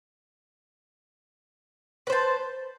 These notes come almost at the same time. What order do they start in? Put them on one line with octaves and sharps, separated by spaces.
B4 C5 A5